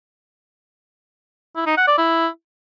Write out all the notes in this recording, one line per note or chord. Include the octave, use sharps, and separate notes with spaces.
E4
D#4
F#5
D5
E4